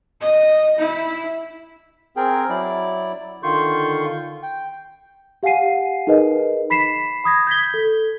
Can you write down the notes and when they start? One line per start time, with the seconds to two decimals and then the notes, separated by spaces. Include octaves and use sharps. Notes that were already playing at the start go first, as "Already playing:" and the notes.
0.21 D#5
0.78 E4
2.16 C4 G#4 A#4 G5
2.49 F#3 E4 D5
3.43 D3 D#3 F4 C6 C#6 G6
4.43 G5
5.43 G4 F5 F#5 G#5 C7 D#7
6.07 D#4 G#4 A#4 B4 D#5
6.70 B5 B6 C7 E7
7.24 B5 D#6 G#6 A#6
7.47 G6 G#6 B6 G7
7.74 A4